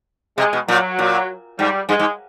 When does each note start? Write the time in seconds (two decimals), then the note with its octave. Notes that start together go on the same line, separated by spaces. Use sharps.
0.37 C3 G#3
0.53 B2
0.68 A#2 F#3
0.99 A#2
1.59 G#2 G3
1.89 G2 G#3
2.00 G#2